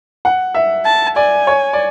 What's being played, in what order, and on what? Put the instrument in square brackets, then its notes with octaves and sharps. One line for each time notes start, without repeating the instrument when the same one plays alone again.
[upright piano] F#5
E5
[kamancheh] A5
[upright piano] D5 [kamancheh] G#5
[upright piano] C#5
D5